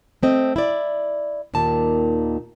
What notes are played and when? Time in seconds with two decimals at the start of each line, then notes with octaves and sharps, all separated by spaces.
0.23 A3 C4 D#5
0.56 E4 D5
1.54 D#2 A#2 D#3 A5